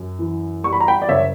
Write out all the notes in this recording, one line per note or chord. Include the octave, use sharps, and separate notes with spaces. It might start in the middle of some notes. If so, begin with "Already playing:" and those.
Already playing: F#2
E3
G3 C#6
B5
A#5
G5 B5
D5
F#1 C#5 E5